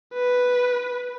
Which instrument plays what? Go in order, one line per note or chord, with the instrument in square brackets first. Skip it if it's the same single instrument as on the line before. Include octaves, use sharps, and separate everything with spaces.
[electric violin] B4